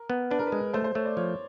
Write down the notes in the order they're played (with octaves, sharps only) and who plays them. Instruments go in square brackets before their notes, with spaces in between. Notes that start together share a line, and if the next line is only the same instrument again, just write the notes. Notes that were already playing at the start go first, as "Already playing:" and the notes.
Already playing: [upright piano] A#4
[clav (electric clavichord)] B3
[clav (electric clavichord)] D4 [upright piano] B4
[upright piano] A#4
B4
[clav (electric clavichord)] G#3
[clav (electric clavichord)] A3 [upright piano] C5
[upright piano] C5
[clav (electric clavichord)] A3 [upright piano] C#5
[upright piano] D5
[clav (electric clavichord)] F3 [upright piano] C#5